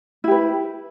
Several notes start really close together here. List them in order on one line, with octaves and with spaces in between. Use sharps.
E4 G4 B4